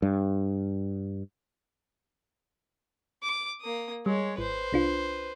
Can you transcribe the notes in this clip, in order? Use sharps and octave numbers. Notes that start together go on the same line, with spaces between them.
G2
D6
A#3 D#6
G3 G#3 C#5
G#1 B4 C5
C2 D4 F4